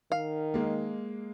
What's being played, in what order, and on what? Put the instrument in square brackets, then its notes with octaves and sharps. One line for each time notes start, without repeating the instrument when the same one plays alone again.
[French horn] D#3 [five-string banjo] F5
[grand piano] G#3 A#3